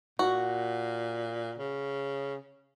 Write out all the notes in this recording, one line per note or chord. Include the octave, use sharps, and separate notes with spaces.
A#2 F#4
C#3